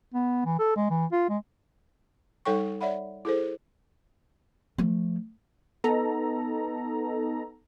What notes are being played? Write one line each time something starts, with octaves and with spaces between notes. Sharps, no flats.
B3
E3
A4
G#3
E3
F4
G#3
G3 D#4 A4 C#5 G5 C#6
C#5 D5 E5 F#5 B5
E4 G#4 A4 C5
F3 A3
B3 D#4 A4 A#5